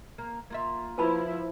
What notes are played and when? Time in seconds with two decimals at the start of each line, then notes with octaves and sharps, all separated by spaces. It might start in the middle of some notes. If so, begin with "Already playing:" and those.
0.18 A#3
0.50 A#3 F4 E5
0.98 F3 E4 B4 A5 B5